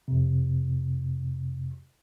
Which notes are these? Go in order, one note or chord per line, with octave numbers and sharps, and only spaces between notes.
F2 C3